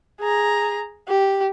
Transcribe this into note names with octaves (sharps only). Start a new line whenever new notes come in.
G#4 A#5
G4